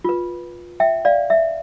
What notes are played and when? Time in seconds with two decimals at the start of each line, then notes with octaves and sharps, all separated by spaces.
0.04 F4 B4
0.80 E5 G5
1.05 D5 F5
1.30 E5